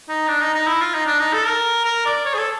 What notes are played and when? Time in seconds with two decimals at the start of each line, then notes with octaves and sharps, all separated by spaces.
0.09 D#4
0.28 D4
0.41 D#4
0.54 D#4
0.67 E4
0.81 F4
0.94 D#4
1.06 D4
1.19 D#4
1.33 A4
1.47 A#4
1.85 A#4
2.05 D5
2.25 C#5
2.34 G#4
2.38 A4